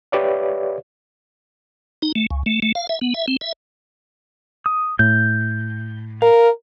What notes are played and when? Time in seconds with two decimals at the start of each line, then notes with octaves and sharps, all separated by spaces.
0.12 G4 B4 C#5 D5 E5 F5
2.02 D#4
2.15 A3
2.30 C#2
2.46 A3
2.62 A3
2.75 F5
2.89 E5
3.01 B3
3.14 E5
3.28 C4
3.41 E5
4.66 D#6
4.99 A2 G6
6.22 A#4 F5